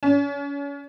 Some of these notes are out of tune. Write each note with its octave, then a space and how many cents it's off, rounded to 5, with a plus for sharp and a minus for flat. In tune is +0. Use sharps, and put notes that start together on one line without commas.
C#4 +35